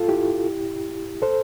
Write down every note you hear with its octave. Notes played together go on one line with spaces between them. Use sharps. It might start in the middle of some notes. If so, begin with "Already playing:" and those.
Already playing: F4 A4
E4 G4
A4 C5